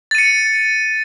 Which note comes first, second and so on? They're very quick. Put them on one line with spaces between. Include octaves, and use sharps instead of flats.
A6 D#7 C#7